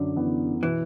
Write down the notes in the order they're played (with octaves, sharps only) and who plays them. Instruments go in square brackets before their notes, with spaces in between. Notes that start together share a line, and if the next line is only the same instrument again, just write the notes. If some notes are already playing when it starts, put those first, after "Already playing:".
Already playing: [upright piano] F#2 [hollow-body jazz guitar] D3
[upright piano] E3 B3
[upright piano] B2 [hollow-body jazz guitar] E3